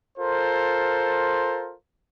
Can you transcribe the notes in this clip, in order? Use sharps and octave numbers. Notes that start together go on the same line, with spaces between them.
F4 A4 A#4 C5